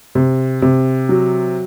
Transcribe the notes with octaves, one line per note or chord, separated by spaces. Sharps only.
C3
C3
F#3